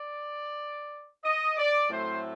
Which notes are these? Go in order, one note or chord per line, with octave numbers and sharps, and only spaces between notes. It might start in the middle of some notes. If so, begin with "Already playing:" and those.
Already playing: D5
D#5
D5
A2 F#3 A3 C4 C5